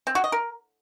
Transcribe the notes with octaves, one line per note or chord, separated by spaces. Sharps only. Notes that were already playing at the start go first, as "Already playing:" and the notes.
C4
F#4
D#5
A#4